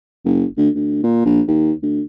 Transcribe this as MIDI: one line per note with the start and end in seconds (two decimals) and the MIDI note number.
0.25 0.45 30
0.57 0.69 38
0.75 1.00 38
1.04 1.23 46
1.25 1.41 34
1.48 1.72 39
1.82 2.01 38